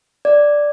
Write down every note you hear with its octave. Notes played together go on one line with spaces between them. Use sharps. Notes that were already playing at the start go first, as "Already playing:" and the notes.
D5